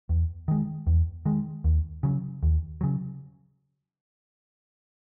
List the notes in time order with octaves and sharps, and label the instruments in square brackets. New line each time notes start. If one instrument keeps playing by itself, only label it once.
[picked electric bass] E2
D#3 G#3
E2
D#3 G#3
D#2
C#3 F#3
D#2
C#3 F#3